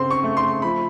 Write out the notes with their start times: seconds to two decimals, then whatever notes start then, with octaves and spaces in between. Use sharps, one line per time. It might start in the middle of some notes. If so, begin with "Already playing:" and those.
Already playing: C#3 C4 C6
0.11 C#6
0.24 A3
0.37 C6
0.62 F3 B5